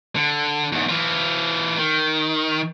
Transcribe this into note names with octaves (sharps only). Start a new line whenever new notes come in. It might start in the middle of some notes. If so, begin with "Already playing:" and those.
D3
E2 G#2
E3 F4
D#3